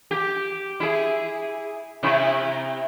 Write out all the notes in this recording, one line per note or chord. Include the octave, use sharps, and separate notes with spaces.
G4
E4 G#4
C3 E4